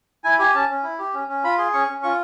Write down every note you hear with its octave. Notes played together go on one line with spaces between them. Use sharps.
E4 G#5
G4 G#5
C#4 A5
C#4
E4
G4
C#4
C#4
F4 B5
G#4 C6
C#4 C#6
C#4
F4 C#6